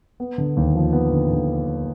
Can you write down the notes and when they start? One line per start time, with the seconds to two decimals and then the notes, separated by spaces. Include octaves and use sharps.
0.20 B3
0.38 D3
0.57 D#2
0.75 F3
0.93 B3
1.11 D3
1.30 D3